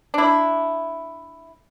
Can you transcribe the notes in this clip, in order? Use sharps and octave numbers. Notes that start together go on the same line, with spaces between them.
D4 E4